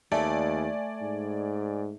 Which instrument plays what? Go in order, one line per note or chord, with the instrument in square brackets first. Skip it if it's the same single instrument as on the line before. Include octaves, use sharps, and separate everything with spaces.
[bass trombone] D#2 [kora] A3 [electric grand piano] D5 G#5
[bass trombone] G#2